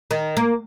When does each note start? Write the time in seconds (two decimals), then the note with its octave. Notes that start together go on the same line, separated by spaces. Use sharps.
0.11 D#3
0.37 A#3